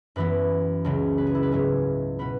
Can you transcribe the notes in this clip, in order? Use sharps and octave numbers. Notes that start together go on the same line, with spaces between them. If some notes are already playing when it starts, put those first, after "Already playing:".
F#2 E3 B3 B4
C#2 C#3 F#3 B3
B4
G#4
E4
B4
G#2 F#3 B3 G#4
B2 B3 B4